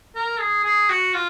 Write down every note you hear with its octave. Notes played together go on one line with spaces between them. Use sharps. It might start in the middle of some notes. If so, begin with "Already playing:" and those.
A#4
G#4
G#4
F#4
F4